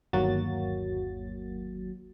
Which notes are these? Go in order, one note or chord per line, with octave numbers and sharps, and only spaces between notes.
G1 D#2 F#3 A#3 F#4 A6